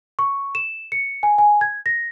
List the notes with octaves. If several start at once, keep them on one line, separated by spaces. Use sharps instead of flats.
C#6
E7
C#7
G#5
G#5
G#6
A#6